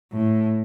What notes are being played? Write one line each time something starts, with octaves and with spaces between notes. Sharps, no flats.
A2